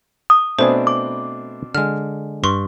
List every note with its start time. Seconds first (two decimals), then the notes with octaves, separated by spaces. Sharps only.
0.30 D#6
0.59 B2 A3 C4 D4 B4 C5 G#5
0.87 D6
1.75 D3 G#3 F6
2.44 G2 C6 C#6